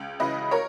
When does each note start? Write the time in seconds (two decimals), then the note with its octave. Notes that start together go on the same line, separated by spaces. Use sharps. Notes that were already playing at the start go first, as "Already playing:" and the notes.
Already playing: C#2
0.20 C#3 E3 B4 D#5
0.51 A#4 C#5